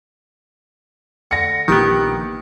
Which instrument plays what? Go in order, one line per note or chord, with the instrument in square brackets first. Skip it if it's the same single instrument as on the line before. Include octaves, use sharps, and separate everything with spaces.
[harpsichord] D3 [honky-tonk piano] A#6 C#7
[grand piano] A#1 A#3 D7 [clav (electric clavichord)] D#3 B3 [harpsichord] G4 A5